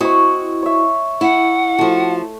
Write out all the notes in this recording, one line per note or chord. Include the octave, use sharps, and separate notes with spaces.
C4 E4 F#4 D#5 C#6
C#5 E5
E4 F#5
F3 A3 F#4